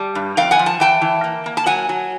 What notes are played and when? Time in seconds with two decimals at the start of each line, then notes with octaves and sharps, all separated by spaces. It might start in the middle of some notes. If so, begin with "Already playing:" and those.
Already playing: G3 A5
0.15 G2
0.37 F2 F5 G5
0.51 F#5 G#5
0.59 F3
0.66 A5
0.80 E3 G5 A5
1.02 E3
1.24 A#3
1.46 A#3
1.57 A5
1.66 F#3 F#5 G#5
1.89 F#3